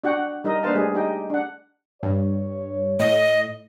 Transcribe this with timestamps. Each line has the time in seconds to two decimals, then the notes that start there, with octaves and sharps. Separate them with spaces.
0.04 D4 F#4 F#5 G5
0.44 G3 D#4 A#4 D#5
0.63 A#3 D4 B4 C5 F5 A5
0.75 G3 A3 D4 G#4
0.94 D#4 G4 D#5 G5
1.30 D4 F#5
2.03 G2 C#5
2.99 A2 D#5